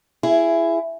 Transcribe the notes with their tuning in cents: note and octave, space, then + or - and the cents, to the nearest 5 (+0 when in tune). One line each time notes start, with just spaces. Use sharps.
E4 +20 G#4 +0